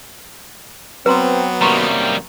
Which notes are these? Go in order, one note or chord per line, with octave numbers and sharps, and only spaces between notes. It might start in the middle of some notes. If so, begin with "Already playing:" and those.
F#3 B3 C4 B4 A#5 C6
F#2 C3 D#3 G3 A#3 A#5 C6 C#6